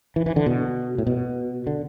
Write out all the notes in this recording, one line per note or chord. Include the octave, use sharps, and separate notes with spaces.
E3
E3
D3
B2
A2
B2
D3